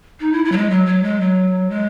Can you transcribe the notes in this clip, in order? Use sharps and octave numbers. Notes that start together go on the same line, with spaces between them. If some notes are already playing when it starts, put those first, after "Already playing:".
D#4
E4
E4
F#3
G#3
F#3
F#3
G#3
F#3
G#3